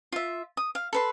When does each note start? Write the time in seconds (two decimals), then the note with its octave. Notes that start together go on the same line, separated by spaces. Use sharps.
0.12 F4 E5
0.57 D#6
0.75 F5
0.93 A4 B4 C6